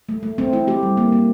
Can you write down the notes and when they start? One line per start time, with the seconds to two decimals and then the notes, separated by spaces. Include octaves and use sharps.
0.09 A3
0.23 A3
0.38 A3 C4
0.53 A3 E4
0.67 A3 G4
0.83 G3
0.97 A#3
1.12 A#3